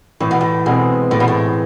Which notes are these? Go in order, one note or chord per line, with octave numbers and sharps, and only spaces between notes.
A2 E3
B2
A2
B2 G#3 C4 G#4
A2 E3
B2
A2